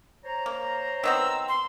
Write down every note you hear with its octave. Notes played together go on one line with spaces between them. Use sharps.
C5 C#5 A#5
A#3
D#3 B3 C4 E6
C6